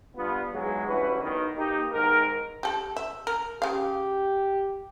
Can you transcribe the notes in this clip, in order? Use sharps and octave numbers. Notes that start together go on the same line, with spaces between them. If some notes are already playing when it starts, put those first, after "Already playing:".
G2 B3 F4
E2 G#2 F#3 G#3
D2 G2 E3 C#4 F#4 B4
B1 D#3 B3
A#3 D#4 G4
E2 G#2 D#3 A#4
G4 A4
E5
A#4
C#3 G4 F5